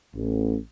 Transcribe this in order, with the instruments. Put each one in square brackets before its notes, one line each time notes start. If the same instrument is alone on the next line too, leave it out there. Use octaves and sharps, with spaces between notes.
[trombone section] A1